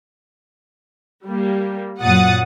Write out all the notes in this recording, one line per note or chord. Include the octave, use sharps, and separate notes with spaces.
G3 A#3
F#2 A#2 F#3 F#5 D#6 A6